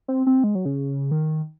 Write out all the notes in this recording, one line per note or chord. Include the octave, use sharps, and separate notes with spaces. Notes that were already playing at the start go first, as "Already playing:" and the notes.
C4
C4
G#3
F#3
C#3
D#3